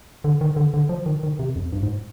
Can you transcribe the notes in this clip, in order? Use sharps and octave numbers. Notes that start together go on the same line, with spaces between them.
D3
D#3
D3
D3
F3
D#3
D#3
C3
F2
G2
G#2